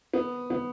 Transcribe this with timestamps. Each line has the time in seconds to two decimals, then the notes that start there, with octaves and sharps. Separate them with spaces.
0.13 B3
0.50 B3